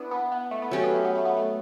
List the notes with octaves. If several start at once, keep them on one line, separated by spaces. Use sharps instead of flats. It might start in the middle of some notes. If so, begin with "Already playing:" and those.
Already playing: B3 D4 E4
B3
B3
A3
B3
F#3 A3 C#4 G4
B3
A3
B3
A3
B3
A3